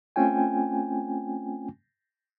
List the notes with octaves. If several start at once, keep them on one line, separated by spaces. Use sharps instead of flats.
A3 C4 C#4 F4 G5 G#5